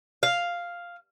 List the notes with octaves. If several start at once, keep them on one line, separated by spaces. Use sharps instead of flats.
F5